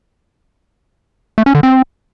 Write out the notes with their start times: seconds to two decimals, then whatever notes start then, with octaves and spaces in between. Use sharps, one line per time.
1.38 A3
1.46 C#4
1.55 D3
1.63 C4